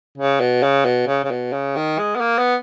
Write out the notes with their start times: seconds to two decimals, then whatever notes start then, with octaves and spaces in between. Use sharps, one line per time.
0.18 C#3
0.40 B2
0.63 C#3
0.85 B2
1.07 C#3
1.24 C#3
1.31 B2
1.53 C#3
1.76 D#3
1.98 G#3
2.15 B3
2.21 A#3
2.38 B3